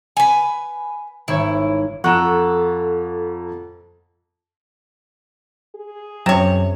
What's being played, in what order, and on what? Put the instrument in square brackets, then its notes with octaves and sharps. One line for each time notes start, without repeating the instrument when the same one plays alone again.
[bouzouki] B4 G#5
[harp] G#1 C#5 [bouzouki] E4
[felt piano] F2 A#5 E7 [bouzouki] A4 [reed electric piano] F#5 C#6 F#6
[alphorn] G#4
[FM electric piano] F#2 [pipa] C3 C#5